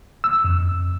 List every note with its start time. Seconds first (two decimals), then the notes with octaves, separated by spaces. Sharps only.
0.24 E6
0.44 F2